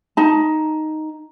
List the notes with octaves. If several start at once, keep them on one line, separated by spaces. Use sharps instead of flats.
D#4 A5